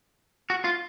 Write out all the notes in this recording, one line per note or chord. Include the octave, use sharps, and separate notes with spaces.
F#4
F4